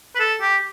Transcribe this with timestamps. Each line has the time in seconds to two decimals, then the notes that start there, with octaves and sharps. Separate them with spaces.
0.15 B4
0.19 A4
0.41 G4